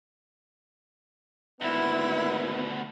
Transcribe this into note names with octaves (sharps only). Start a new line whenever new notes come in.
G#1 D2 B2 A#3 B3 E4